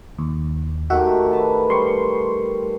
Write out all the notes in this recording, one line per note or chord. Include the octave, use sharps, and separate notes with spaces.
D#2
D#3 A3 F#4 G4 E5 F#5
B4 A5
G3 C6 C#6